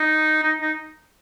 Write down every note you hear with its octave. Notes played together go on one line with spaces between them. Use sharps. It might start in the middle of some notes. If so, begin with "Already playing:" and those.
Already playing: D#4
D#4
D#4